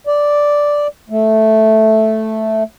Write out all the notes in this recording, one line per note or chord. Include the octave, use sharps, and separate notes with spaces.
D5
A3